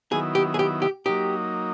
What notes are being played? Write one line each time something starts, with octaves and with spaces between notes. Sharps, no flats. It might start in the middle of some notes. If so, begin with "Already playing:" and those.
D#3 F#3 B3 E4 G#4
G4
G#4
G4
G4
F#3 A#3 D#4 G4